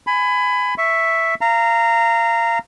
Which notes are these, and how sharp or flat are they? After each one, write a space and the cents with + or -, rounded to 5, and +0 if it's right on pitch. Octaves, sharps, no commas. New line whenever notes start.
G#5 +0 B5 +25
E5 +0 C#6 +0
F5 -25 A#5 -15